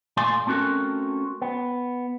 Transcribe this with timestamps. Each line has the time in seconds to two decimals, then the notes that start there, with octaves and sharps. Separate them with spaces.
0.17 A#2 A3 D5 F5 G#5 C6
0.47 A3 C4 C#4 F#4 A4 A#4
1.42 B3